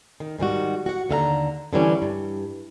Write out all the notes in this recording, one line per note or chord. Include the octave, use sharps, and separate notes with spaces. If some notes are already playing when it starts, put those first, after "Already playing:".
D#3
G#2 D#3 G3 F#4
F#4 F#5
D#2 D3 F5 A#5
D3 E3 G3 C#4
G2